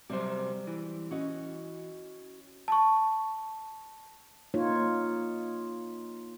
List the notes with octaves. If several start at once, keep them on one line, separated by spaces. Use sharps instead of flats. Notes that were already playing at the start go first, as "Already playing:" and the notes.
C3 F#3 G3 C5
E3
C#4 F#4 D#5
A5 C#6
A#3 D#4 F4 C#5